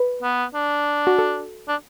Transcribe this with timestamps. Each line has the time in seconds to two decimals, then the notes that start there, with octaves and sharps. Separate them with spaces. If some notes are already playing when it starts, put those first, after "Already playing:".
Already playing: B4
0.22 B3
0.54 D4
1.07 F#4
1.18 A4
1.68 D4